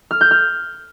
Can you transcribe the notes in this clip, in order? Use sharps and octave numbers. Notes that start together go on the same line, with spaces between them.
F6
G6
F6